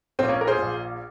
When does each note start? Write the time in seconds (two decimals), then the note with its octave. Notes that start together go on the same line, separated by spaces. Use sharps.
0.19 A#1 A#2 C4
0.28 A#3 C#4
0.41 A#4
0.47 G#4 C5
0.57 A#1 A#2